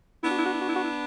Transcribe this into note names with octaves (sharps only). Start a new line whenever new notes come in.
B3 D4 E4
F#4
E4
F#4
E4
F#4
E4
F#4
E4